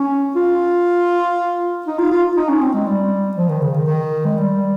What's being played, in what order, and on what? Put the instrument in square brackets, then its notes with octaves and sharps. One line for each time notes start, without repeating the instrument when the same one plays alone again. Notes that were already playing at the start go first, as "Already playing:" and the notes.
Already playing: [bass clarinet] C#4
F4
D#4
F4
F4
D#4
C#4
C4
G#3
G3
F3
D#3
C#3
D#3
D#3
G#3
G3